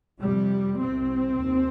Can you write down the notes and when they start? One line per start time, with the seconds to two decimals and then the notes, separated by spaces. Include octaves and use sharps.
0.20 F2 C3 G3
0.79 C2 C3 C4
1.39 D#2